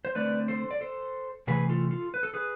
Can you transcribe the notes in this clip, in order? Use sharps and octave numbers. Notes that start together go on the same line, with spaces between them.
C5
D3 A3 C4 B4 D5
A4 C5
D5
A4 C5
C3 E3 A3 G#4 B4
F4 A4
F4 A4
B4
A4
G#4 B4